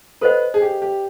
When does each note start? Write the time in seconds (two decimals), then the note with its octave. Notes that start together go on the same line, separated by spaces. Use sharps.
0.21 A4 B4 C5 D#5 F#5
0.54 G#4
0.62 G4
0.82 G4